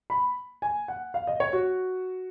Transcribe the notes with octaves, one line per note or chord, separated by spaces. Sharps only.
B5
G#5
F#5
F5
D#5
C#5
F#4